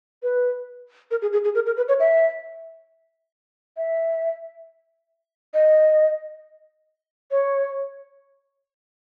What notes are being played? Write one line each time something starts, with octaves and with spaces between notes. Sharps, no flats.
B4
A#4
G#4
G#4
G#4
A#4
A#4
B4
C#5
E5
E5
D#5
C#5